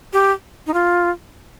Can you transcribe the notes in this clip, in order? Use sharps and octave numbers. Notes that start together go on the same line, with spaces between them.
G4
D#4
F4